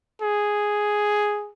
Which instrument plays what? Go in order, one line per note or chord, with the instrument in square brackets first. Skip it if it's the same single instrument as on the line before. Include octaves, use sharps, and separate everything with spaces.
[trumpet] G#4